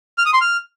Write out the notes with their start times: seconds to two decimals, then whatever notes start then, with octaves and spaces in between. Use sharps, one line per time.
0.18 F6
0.26 D#6
0.33 C6
0.41 F6